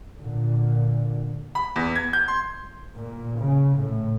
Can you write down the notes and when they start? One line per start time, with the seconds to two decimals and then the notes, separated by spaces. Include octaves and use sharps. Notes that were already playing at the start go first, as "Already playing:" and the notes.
0.16 A#2 D3
1.55 B5
1.76 E2
1.96 G#6
2.13 G6
2.28 C6
2.95 A#2
3.41 C#3
3.80 A2